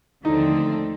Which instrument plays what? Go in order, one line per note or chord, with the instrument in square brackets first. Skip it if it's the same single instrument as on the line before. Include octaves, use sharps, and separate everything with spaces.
[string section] D#2 D3 F3 A3 C4 [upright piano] D#4